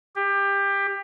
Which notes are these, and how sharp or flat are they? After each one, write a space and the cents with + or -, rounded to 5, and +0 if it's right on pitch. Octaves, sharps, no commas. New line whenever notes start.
G4 +20